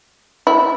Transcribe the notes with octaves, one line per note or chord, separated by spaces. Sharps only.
E4